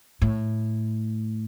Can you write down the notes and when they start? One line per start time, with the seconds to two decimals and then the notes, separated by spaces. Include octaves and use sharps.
0.22 A2